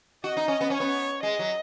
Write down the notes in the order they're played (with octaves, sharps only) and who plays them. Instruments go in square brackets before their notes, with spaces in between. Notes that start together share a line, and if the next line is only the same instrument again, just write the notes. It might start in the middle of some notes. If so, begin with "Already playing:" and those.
[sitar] F#4 [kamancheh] D#5
[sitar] D#4
C#4
B3
[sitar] C#4 [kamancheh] C#5
[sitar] B3
[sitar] G#3 [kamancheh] D#5
[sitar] F#3